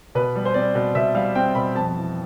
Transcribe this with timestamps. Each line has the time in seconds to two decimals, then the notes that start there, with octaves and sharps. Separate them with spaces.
0.15 B2 B4
0.35 G3
0.45 C5
0.54 C4 D5
0.75 B2
0.95 B2 E5
1.15 G3 F5
1.35 C4 G5
1.55 B2 B5
1.75 F2 A5
1.96 E3